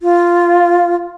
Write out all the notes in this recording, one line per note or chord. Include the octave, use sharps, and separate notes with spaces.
F4